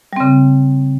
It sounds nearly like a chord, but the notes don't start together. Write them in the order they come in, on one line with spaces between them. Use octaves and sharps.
G3 C4 C#3